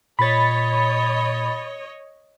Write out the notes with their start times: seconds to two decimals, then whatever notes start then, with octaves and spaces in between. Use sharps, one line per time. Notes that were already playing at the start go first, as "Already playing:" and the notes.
0.19 A#2 C#5 D#5 B5 A6